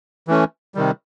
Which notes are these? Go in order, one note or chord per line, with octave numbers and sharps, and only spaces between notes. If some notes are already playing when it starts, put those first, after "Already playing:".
E3 A3 C#4
C3 D#3 G3